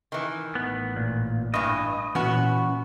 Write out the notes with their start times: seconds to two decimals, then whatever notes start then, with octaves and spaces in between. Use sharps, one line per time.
0.12 D#3 E3
0.55 A1 B3
0.96 A#2
1.54 G2 E3 D#5
2.15 A#2 E3 B3 C#4 F#4